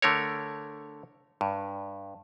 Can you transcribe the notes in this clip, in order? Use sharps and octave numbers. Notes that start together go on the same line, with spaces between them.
D3 A3 A#4 C#5
G2